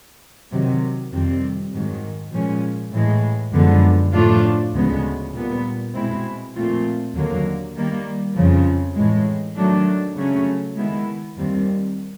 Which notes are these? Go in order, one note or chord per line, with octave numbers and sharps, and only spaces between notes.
C3 D#3 F#3
F2 C3 D#3 G3 C4
G#2 D#3 F#3
A#2 F3 G#3 C#4
A2 E3 G#3
F#2 D3 F3 G#3 B3
A2 F3 A3 D4 F4
D2 C#3 F3 G#3 B3
A#2 G3 B3
B2 G#3 C4 E4
A#2 F3 A3 C4 F4
D#2 D3 F#3 A#3
D#3 G3 A#3
F2 C#3 F3
A2 E3 G#3
D#3 F#3 A3 D4
C#3 F#3 A3 C#4
D#3 G#3 B3 E4
D#2 D#3 G3 C4